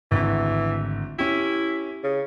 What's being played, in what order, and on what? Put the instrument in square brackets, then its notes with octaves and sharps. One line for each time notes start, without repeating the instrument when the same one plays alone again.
[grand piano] G#1 D2 [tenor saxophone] E3
[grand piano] C#4 G4 [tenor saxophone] E4
[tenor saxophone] C#3